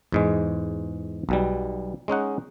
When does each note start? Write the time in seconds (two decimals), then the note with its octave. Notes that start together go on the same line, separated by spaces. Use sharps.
0.12 E2 G#2 G#3
1.29 B1 B2 G3
2.08 G#3 C#4 D#4 F#5